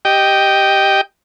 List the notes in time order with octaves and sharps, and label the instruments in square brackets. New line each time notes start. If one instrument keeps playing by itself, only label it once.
[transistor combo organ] G4 D#5 G5